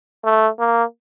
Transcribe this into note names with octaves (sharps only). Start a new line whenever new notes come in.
A3
A#3